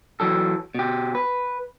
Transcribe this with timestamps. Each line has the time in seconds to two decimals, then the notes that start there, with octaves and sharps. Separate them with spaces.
0.20 E3 F#3 A4
0.75 B2 G4
1.15 B4